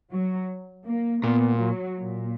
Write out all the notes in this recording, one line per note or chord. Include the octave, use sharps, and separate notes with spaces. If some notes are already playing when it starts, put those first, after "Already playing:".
F#3
A#3
A#2 B3
F#3
A#2